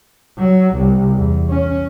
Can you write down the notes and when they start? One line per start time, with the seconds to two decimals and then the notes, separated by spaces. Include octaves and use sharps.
0.38 F#3
0.76 C2
1.18 E2
1.50 C#4